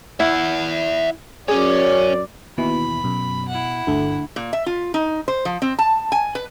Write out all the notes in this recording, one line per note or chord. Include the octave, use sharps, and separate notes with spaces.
E4 E5 F#5
F#2 C#4 G#4 C#5 D5
D#2 B2 E3 B5
F#2 B2
E4 F#5
G1 D2 A3 D4
A#2
E5
F4
D#4
C5
F3
C4
A5
G#5
B4